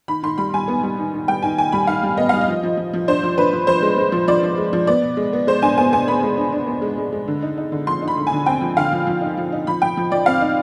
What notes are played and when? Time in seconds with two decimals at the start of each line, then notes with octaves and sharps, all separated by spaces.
0.08 D#3 B5
0.23 D#3 C6
0.38 G3 B5
0.54 G3 G#5
0.68 B3
0.83 G3
0.98 D#3
1.14 D#3
1.28 G3 G5
1.42 D#3 G#5
1.58 D#3 G#5
1.72 G3 B5
1.87 D#3 F5
2.03 G3
2.17 B3 D#5
2.29 G3 F5
2.41 D#5
2.48 F3
2.63 F3
2.77 F3
2.93 F3
3.08 D4 C5
3.23 F3
3.38 D4 B4
3.53 F3
3.67 F3 C5
3.82 G#3
3.97 G#3
4.12 F3
4.28 F3 D5
4.43 F3
4.58 G#3
4.73 F3
4.87 B3 D5
5.02 B2
5.17 G#3
5.33 B3
5.47 G#3 C5
5.62 D4 G#5
5.78 B3 G#5
5.92 B3 G#5
6.08 B3 B5
6.23 G#3
6.37 D4
6.52 D4
6.67 B3
6.82 G#3
6.98 G#3
7.12 G#3
7.28 D3
7.43 D#4
7.57 D#4
7.72 D3
7.87 F3 C6
8.02 D#4
8.08 B5
8.17 D3
8.27 G#5
8.32 D3
8.46 C4 G5
8.61 F3
8.77 D3 F5
8.92 F3
9.07 F3
9.21 D#4
9.37 F3
9.52 D#4
9.67 F3 B5
9.82 F3 G5
9.97 F3
10.11 F3 D5
10.26 C4 F5
10.41 D#4